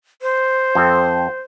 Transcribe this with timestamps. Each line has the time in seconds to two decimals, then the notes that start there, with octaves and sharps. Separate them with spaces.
0.22 C5
0.75 F2 C4 A4